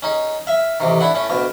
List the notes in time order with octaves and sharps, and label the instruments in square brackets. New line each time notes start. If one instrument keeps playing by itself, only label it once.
[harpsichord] C#4 D#4 G#4
E5 F5
A1 C3 D#3
D4 E4 F#5
A2 C#4
D2 B2 F5